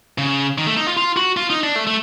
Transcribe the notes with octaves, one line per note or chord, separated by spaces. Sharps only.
C#3
D#3
A3
D#4
F4
F4
F#4
F4
D#4
D4
A3
A3